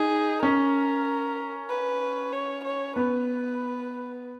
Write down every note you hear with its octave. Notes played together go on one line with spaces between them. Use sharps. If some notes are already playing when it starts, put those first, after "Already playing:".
Already playing: D#4 G#4
C#4 A#4
B4
C#5
C#5
B3 B4